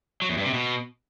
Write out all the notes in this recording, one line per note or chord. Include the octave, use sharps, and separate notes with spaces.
F#3
E2
G2
C3
B2